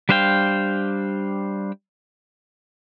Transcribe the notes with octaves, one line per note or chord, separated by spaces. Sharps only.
G3 D4 C5 F5 G5